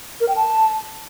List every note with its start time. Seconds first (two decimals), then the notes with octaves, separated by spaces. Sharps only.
0.21 A#4
0.28 G5
0.36 A5